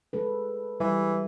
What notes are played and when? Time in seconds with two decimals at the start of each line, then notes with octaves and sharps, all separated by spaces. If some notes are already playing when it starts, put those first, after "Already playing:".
0.13 G#3 A4 B4
0.80 E3 G3